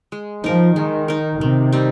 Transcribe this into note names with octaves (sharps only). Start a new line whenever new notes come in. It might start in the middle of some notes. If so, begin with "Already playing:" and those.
G#3
F3 D#4 A#4
D#3 G#3
D#4 A#4
C3 D#3
G3 C4 D#4